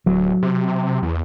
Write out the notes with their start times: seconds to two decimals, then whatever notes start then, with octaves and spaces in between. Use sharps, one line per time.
0.06 D1 F#3
0.43 C3
1.03 E2